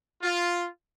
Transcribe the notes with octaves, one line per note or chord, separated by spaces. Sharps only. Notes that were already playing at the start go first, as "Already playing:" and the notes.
F4